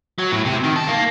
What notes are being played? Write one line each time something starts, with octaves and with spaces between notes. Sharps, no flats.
F#3
A2
C3
D#3
A4
A#3